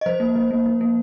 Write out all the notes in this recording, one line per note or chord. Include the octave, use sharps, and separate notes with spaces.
D#5
F3 C5
A#3
F3
A#3
F3
A#3